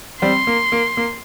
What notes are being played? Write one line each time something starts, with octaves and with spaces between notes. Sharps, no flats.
G3 C4 C6
A#3
A#3
A#3